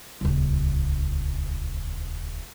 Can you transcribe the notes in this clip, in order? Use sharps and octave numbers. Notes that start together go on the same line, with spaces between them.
D#1 C#2